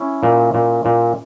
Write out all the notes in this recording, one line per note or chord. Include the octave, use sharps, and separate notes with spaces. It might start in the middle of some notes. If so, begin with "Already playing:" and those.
Already playing: C#4 E4
A#2
A#2
A#2